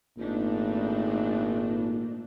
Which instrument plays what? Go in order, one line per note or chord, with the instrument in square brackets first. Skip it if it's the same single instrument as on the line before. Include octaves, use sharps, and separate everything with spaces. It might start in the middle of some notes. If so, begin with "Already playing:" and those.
[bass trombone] G#1 [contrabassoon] A#2 [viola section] A3 D4 D#4